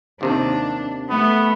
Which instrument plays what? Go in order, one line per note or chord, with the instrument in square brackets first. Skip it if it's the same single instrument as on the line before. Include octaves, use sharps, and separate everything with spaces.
[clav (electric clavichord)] D#2 C3 D#3 [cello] D4
[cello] A3 [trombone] B3